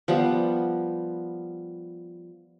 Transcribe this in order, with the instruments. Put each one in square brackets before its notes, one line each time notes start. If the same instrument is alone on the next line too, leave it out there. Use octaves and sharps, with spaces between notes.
[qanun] F3 G3 B3